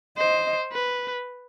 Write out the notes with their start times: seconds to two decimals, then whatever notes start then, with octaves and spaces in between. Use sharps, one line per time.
0.18 C5 D#5
0.72 B4